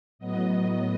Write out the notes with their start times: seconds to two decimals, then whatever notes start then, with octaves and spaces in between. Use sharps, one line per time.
0.19 A2 F#3 B3 D#5